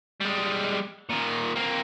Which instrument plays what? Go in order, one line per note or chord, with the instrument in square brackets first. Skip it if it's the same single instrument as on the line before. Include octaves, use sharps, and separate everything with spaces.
[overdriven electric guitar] G3 G#3
A#2 D#3
A#3 C4